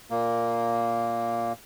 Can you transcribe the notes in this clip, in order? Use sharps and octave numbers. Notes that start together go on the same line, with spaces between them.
A#2 A#3